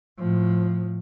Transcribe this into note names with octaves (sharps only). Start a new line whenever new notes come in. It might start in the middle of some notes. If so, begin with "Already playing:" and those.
A2 F3